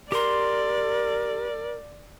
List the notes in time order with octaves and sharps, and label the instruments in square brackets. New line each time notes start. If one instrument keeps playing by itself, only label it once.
[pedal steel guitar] G4 C6 [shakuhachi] A#4 [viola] D5